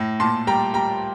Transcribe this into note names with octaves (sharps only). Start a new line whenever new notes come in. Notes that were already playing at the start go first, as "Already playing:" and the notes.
Already playing: A2
A#2 A5 C6
G3 G5 A#5
G3 G5 A#5